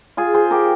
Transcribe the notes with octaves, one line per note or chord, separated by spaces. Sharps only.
F4 G#4
G#4 C5
G4 A#4